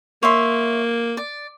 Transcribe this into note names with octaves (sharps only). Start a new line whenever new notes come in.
A#3 C#5 E5 C6
D5